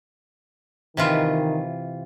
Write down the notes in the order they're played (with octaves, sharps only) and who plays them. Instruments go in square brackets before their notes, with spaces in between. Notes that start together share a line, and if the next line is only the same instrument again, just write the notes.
[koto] C3 E3 F4 [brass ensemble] D#3